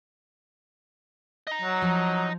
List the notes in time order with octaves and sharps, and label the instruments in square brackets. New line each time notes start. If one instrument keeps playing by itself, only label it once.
[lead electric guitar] D#5 A#5
[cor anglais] F#3
[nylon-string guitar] F3